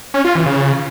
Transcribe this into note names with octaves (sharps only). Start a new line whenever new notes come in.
C#4
F4
E3
C#3